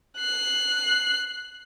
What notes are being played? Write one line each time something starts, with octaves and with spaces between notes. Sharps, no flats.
F#6 C7